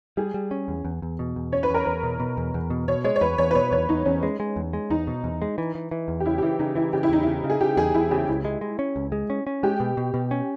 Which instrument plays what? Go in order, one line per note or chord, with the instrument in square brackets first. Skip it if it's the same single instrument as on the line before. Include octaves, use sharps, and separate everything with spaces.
[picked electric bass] G3 [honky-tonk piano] G#4
[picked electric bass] G3
C#4
E2
E2
E2
B2
E2
[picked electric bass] C#4 [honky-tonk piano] C#5
[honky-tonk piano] B4
[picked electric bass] E2 [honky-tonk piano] A#4
[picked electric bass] E2 [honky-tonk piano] B4
[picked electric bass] B2
B2
E2
E2
B2
[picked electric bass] B2 [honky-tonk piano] C#5
[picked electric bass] G#3 [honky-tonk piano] C#5
[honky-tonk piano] C#5
[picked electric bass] E2 [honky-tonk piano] B4
[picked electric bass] E2 [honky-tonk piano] C#5
[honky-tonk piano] B4
[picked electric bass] B2 [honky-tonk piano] C#5
[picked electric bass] E2 [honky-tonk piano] C#5
[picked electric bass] E2 [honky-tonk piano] D#4
[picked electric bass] E2 [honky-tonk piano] C#4
[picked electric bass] G#3 [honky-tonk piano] C#4
[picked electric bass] G#3
E2
G#3
[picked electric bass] E2 [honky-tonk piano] D#4
[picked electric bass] B2
E2
G#3
E3
E3
E3
E2
[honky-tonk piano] G4
[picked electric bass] C#3 [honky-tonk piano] E4
[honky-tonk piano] G4
[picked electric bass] E3 [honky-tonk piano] E4
[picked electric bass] C#3 [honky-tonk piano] D#4
[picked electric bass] E3 [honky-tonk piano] E4
[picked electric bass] C#3 [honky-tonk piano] G4
[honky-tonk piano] E4
[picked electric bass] E2 [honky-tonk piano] D#4
[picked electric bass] C#3 [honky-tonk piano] E4
[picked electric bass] C#3
[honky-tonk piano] G#4
[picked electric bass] C#3 [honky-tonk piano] G4
[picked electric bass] E2 [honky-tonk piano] G#4
[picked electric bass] E2 [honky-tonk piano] E4
[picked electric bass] C#3 [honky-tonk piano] G4
[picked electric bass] C#2 [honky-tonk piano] E4
[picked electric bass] G#3
G#3
C#4
C#2
G#3
C#4
C#4
[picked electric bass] G#3 [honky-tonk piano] G4
[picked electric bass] B2
B2
B2
C#4